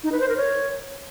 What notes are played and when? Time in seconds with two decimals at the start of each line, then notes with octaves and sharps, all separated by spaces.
0.04 D#4
0.12 B4
0.20 C5
0.29 A#4
0.37 C#5